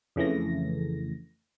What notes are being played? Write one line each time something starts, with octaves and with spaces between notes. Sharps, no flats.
F2 C#3 E3 A3 A#6